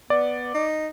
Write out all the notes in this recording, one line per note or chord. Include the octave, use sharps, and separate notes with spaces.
B3 D5
D#4